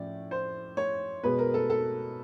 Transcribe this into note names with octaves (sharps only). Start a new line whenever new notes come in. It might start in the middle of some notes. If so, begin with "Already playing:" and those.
Already playing: A2 F3 A3 C#4 D5
C5
C#5
B2 G#3 B3 B4
A#4
A4
A4